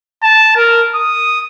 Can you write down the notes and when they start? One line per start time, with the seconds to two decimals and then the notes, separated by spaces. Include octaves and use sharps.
0.23 A5
0.56 A#4
0.95 D#6